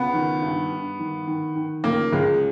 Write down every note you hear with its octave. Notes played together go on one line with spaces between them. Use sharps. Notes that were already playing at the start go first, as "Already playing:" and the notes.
Already playing: C#2 B3
D#3
G2
G2
D#3
D#3
D#3
C#2 A#3
C#2 G#3